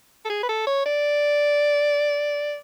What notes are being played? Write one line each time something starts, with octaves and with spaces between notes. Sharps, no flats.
A4
G#4
B4
A4
C#5
D5